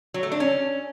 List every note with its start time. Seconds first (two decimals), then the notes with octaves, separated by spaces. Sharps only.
0.14 F#3
0.23 A3
0.32 D4
0.40 C#4